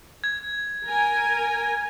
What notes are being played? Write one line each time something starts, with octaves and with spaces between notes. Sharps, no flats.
G#6
A#4 G#5